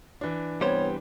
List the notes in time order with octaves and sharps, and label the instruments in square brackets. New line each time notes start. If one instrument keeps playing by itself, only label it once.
[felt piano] E3 D4
[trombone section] C2 B3 C4 [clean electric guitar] G3 C5 [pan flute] C#5